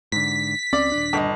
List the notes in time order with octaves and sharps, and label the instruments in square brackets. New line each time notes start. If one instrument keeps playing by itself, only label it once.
[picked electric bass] G#2 D3 [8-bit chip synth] B6
[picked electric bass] C#2 C4 C#4 [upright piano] D5
[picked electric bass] D#1 D4
[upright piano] G1 D#5